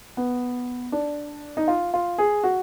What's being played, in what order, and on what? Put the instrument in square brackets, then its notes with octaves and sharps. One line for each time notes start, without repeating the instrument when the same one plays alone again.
[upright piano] B3
D4
D#4
F4
F4
G#4
F#4